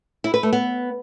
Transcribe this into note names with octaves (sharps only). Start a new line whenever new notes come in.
E4
B4
A3
B3